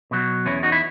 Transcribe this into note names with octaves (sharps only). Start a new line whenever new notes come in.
B2 F#3
E2 C#4 E4
D#4 F#4
E4